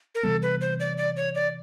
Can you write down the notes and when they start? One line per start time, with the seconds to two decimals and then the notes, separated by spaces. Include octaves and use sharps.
0.15 A#4
0.23 C3 E3 G3 B3 A4
0.42 B4
0.61 C5
0.80 D5
0.98 D5
1.16 C#5
1.35 D5